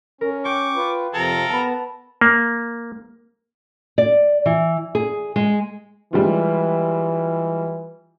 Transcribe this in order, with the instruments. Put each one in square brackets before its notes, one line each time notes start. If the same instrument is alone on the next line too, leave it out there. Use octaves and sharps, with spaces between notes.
[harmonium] C#4 [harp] A#4
[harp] G5 [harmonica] C#6 D6
[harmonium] F4 B4
[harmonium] F2 C3 F3 [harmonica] A4 A#4 A#5
[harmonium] B3 [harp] A5 B5
[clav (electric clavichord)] A#3
[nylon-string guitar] D5
E3
G#4
G#3
[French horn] E3 [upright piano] G3 G#3 F4